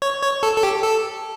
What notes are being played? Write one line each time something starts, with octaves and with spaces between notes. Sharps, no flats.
C#5
C#5
A4
A4
G4
A4